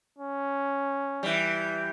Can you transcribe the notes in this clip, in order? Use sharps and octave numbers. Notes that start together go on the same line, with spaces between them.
C#4
E3 G3